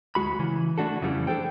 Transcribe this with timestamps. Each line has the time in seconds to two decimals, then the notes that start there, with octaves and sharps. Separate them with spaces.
0.15 D2 G#3 F#4 B5
0.39 C#3 E3
0.78 E3 A3 D4 F#4 A4
1.02 F2 C#3 E3 F#3 G3 A3
1.27 D4 G#4 A4 C5 G5